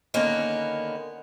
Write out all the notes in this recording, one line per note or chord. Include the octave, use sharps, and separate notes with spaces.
D3 D#3 A#3 B3 C#4